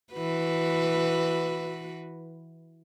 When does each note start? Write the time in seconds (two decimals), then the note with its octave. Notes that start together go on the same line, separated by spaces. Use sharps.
0.13 E3 F#4 B4